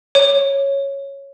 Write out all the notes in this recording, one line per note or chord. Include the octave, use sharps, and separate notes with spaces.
C#5